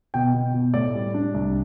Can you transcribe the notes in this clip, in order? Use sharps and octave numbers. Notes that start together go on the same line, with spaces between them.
B2 G5
B2
B2
A2 D5
G3
D4
C2